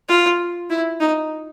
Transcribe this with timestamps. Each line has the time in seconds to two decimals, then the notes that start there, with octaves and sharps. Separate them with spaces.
0.09 F4
0.70 E4
1.00 D#4